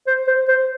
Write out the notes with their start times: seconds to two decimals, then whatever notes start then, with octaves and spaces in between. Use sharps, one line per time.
0.07 C5
0.27 C5
0.48 C5